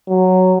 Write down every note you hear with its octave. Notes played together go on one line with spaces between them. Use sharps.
F#3